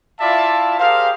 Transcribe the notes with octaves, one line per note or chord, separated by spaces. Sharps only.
E4 F4 D5 E5 F5 A5
G4 G#4 A#4 C5 F5